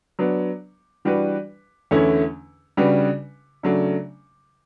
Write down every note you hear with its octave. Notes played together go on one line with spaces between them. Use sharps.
F#3 B3 D4
E3 G3 D4 F#4 B4
E2 D3 A3 C#4 E4
C#3 G3 D4 F#4 B4
C#3 F#3 A3 D4